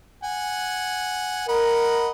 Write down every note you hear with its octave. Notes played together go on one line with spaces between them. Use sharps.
F#5 G#5
A#4 D#5 F#5 B5